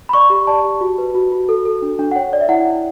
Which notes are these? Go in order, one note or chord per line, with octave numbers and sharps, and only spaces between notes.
B5
D5 C#6
G4
D5 A5
G4
F#4
B4
F#4
F#4
A4
A4
D4
D4
F#5
C#5 G5
C#5 D5
E5
E4 F#5
E4